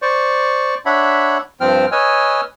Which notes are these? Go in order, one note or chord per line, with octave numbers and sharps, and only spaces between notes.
C5 D5 C#6
D4 C#5 E5 F#5 B5
G2 F3 C4 C5 G5 F6
B4 C#5 D#5 G#5 E6 F6